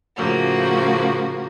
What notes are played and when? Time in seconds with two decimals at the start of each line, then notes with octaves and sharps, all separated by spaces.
0.17 A2 C#3 F3 A#3 F#4